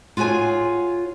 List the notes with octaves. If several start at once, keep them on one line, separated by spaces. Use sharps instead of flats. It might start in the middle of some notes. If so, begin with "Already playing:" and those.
F4 F#4 G#4 C#5 G#5